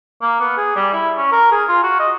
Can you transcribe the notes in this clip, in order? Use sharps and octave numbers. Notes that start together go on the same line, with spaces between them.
A#3
B3
G#4
G3
E4
C#4
A#4
G#4
F4
F#4
D#5